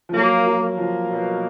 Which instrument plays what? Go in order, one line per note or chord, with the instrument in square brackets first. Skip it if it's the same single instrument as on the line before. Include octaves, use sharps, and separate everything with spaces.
[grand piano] F3
[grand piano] F#3 [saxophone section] A#3
[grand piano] F#3
[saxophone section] A#3
[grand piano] F3
[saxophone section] B2 [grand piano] F#3